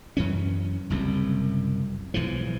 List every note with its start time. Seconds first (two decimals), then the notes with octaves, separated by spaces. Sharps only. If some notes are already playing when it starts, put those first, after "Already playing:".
0.17 F#2 E3 C#4
0.90 F#1 C2 F#2
2.14 B1 G#2 E3 F3